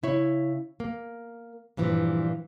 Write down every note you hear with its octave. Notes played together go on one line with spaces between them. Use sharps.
C#3 E4 C#5
A#3
G2 A#2 E3 F3